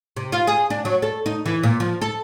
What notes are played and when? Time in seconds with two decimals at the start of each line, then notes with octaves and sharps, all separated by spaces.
0.17 C3
0.32 F4
0.47 G#4
0.70 D4
0.85 F#3
1.02 A4
1.26 D#4
1.46 E3
1.63 A#2
1.80 F3
2.01 A4